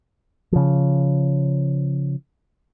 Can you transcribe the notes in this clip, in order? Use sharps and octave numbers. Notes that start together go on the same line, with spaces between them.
C#3 F3